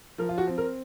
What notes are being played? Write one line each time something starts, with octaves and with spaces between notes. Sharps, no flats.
F3 A#4
F4
F#4
C4
A#4